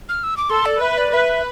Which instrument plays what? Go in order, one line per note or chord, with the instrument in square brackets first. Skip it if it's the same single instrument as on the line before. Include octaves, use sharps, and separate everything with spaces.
[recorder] F6
E6
D6
[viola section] A4 [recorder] C6
[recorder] D5
[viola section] B4 [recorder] E5
[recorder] D5
[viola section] B4 [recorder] E5